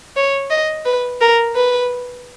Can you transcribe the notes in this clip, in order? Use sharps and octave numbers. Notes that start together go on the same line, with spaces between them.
C#5
D#5
B4
A#4
B4